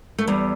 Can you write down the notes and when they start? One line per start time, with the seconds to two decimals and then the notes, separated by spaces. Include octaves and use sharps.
0.18 A3
0.27 E2 G3